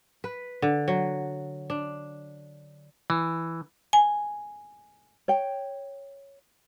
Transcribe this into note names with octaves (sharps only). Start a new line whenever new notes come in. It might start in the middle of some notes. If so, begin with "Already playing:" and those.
B4
D3
F#3
D4
E3
G#5
C#5 G5